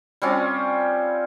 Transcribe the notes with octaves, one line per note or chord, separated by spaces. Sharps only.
G3 C4 C#4 F4